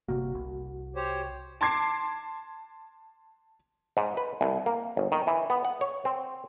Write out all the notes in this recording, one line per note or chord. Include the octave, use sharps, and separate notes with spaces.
G1 C3 A#3 F#4
C2
G4 C5 C#5
A5 C6 D6 G#6 C7
G#2
B4
C2
A#3
G1
D#3
E3
B3
F#5
C#5
C4